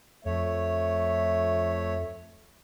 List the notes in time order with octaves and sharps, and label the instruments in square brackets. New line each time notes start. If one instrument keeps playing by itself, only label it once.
[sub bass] F2 [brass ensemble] F3 E5 [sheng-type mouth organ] A3 C#5